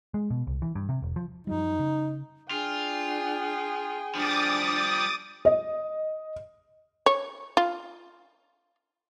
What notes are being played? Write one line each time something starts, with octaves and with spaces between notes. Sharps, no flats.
G#3
B2
C2
E3
G2
C3
E1
F3
F#2 F3 G3 D#4
C#3
D4 F4 G#4 G5
F3 G3 D4 D6 D#6 A6
D#5
C#5
F4